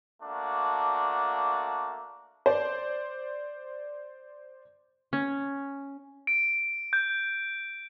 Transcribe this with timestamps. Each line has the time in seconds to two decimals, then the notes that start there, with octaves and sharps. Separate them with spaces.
0.22 A3 A#3 D4 F#4
2.46 C5 D5
5.13 C#4
6.27 D7
6.93 G6